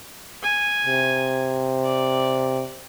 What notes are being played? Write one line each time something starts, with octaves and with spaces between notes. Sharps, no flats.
G#5
C3
D5